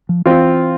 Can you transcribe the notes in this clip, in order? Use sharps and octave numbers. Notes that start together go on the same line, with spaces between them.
F3
E3 C4 F4